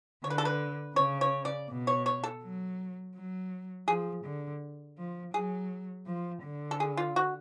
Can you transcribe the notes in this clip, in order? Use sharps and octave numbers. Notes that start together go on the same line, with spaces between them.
D3 C#5
B4
A4
B4
C#3 C#5
C#5
D5
B2
C#5
C#5
A4
F#3
F#3
F3 G#4
D3
F3
F#3 G#4
F3
D3
A4
G#4
F4
F#4